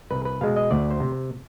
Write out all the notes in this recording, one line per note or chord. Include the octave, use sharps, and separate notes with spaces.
C2 B4
B4
B2 G#3 F5
D#5
D2 D5
C5
C3